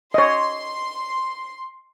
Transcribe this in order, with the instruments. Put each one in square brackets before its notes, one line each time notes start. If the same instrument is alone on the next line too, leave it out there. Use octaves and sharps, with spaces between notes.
[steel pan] C#5 D#5 [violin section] C6